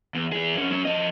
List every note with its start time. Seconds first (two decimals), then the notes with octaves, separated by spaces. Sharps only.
0.15 E2
0.32 E3 G#4
0.55 F2 C#4
0.71 F#3 C#4
0.85 F3 D#5